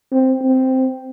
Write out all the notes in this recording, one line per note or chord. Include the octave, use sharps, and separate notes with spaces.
C4
C4